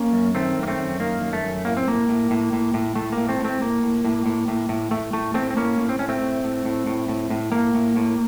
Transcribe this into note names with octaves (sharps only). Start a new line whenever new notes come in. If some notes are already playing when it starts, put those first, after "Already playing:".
Already playing: A#3 C#4
F#2
D#3 A3 C4
F#2
A#3
A3 C4
F#2
D#3 A#3
F#2
A3
F#2
A2 A#3
C4
A2 A#3
A2
A2
A2
A2
A2 A3
A#3
A2
A3 C4
A2
A3 C4
A2 A#3
A2
A2
A2
A2
A2
A2 A3
A2 A3
A2 A3 C4
C4
A2 A#3 C#4
A2
C4
A2 C#4
A3 C4
A2
A2
A2
A2
A2
A2
A2 A#3
A2
A2